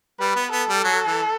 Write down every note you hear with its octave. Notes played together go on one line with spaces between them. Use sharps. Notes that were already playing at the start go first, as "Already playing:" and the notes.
G3 B4
B3
B3 A4
G3
F#3
E3